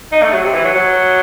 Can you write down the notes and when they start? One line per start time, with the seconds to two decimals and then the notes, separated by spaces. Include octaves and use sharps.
0.12 D#4
0.22 A3
0.33 F#3
0.44 C3
0.54 E3
0.65 F#3
0.75 F#3